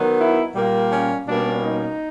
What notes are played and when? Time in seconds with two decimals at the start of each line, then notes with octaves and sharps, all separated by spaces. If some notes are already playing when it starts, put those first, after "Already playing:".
Already playing: D#3 F#3 B3
0.18 E4
0.54 A#2 G3 A#3
0.91 C#4
1.27 B2 G3 A#3 C#4 D4
1.63 D#4